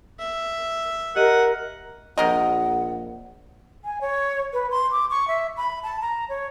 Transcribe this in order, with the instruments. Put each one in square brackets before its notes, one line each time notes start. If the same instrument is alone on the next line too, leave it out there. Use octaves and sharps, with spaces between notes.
[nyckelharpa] E5
[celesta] G4 D#5 D#7 [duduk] A#4 [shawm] F#5
[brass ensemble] A#1 [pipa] C3 A#4 D#5 [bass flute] F#5
[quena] G#5
C#5
B4
C6
D6
C#6
E5
B5
A5
A#5
C#5